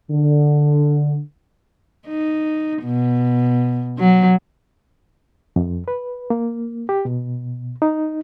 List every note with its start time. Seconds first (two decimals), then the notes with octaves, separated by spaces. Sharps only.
0.11 D3
2.07 D#4
2.84 B2
3.99 F#3
5.56 F2
5.88 B4
6.30 A#3
6.89 G4
7.05 B2
7.82 D#4